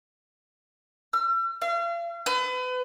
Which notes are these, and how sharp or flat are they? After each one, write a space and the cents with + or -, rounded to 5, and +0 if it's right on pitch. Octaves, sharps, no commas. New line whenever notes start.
E6 +45
F5 -40
B4 +35